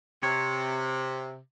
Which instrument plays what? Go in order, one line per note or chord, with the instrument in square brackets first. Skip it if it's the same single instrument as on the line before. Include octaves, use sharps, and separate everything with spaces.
[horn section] C3 [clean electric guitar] C#5